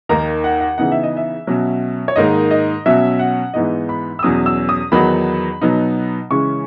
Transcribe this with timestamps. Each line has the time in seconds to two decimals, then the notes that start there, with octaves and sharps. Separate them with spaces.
0.09 D#2 D#3 A#3 D#4 A#5
0.44 F#5
0.61 F#5
0.78 C#3 E3 B3 D#4 F#5
0.92 E5
1.03 D#5
1.17 E5
1.47 B2 F#3 C#4
2.08 C#5
2.16 G#2 D#3 A#3 D#4 D#5
2.51 D#5
2.86 B2 F#3 C#4 E5
3.19 F#5
3.54 G#2 E3 B3 D#4 D#5
3.89 B5
4.19 E6
4.23 E2 B2 F#3 C#4 D#6
4.46 E6
4.69 D#6
4.92 E2 D#3 F#3 B3 D#4 B5
5.61 B2 F#3 B3 D#4
6.30 C#3 E3 G#3 C#4 C#6